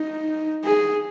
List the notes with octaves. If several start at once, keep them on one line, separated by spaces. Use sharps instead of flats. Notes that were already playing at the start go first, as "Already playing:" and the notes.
Already playing: D#4
G#4